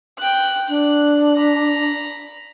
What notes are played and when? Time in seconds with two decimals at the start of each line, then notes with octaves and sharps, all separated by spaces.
0.18 G5 F#6
0.69 D4 F#6
1.37 A#5 B5